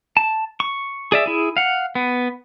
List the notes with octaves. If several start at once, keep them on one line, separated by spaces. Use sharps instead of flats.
A5
C#6
G#4 D5 E5
E4 G#4
F5 F#5
B3